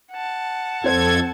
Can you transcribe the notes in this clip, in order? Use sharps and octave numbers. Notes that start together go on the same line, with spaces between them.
F#5 A5
F2 C4 A4 C5 G#6